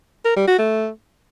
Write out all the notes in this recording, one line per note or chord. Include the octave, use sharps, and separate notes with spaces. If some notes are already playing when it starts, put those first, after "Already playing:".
A#4
G3
F#4
A3